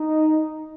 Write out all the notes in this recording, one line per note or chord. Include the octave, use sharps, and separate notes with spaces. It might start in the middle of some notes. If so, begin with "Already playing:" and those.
Already playing: D#4